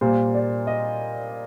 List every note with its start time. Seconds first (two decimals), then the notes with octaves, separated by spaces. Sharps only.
0.01 A#2 G3 A#3 C5
0.35 D5
0.67 D#5